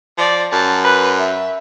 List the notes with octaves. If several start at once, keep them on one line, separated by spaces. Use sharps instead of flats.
F3 D5
F#2 A5
B4
E5